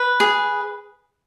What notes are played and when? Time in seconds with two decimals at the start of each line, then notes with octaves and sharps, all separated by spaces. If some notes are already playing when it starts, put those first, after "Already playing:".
Already playing: B4
0.20 G#4